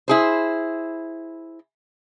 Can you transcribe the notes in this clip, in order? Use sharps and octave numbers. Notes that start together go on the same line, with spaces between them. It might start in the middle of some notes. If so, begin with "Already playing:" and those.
E4 G#4 C5